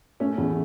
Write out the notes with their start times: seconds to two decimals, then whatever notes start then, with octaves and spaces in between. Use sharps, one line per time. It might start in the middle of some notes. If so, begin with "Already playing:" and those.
0.20 A3 C#4
0.38 E2